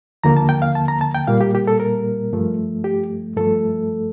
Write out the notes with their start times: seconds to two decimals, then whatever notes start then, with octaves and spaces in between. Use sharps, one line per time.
0.24 D#2 D3 F3 A#3 A#5
0.37 A5
0.49 G5
0.62 F5
0.75 A5
0.88 A#5
1.01 A5
1.15 G5
1.27 A#2 G3 A#3 F5
1.41 G4
1.55 G4
1.67 A4
1.80 A#4
2.33 G2 F3 A3
2.84 G4
3.36 G2 F3 A3 A4